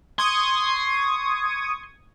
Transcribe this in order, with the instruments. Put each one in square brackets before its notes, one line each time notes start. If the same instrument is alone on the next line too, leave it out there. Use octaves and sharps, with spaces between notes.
[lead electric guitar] C6 [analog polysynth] C#6 D#6 G#6